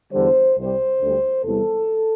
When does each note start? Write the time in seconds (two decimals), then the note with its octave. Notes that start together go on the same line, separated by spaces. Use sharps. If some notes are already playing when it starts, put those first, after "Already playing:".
0.12 E2 D3 G3 C5
0.56 C2 C3 G3 C5
1.00 D2 D3 G3
1.43 E2 C3 E3 G3 A4